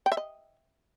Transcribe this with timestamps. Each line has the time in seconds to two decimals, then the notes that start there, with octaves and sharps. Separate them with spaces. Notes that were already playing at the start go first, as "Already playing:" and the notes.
0.06 G5
0.12 E5
0.17 D#5